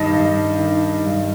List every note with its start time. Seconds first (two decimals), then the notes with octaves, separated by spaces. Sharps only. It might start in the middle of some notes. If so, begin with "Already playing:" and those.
Already playing: G2 D#3 D#5
0.12 G2
0.59 D#3
1.06 G2